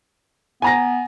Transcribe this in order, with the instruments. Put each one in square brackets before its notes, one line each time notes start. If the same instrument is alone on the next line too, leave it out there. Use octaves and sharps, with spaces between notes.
[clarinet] B3 [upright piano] G#5 A#5 A#6